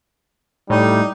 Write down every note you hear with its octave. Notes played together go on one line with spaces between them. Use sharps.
A2 G3 D#4